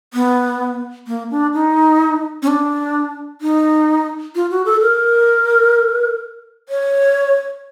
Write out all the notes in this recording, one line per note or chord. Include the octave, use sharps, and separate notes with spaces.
B3
A#3
D4
D#4
C#4
D4
D#4
F4
F#4
A4
A#4
C#5